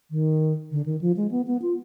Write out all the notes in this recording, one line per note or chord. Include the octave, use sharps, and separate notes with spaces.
D#3
D3
D#3
F3
G#3
B3
B3
F4